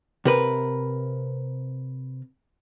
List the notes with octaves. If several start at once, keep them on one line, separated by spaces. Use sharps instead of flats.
C3 A#4 B4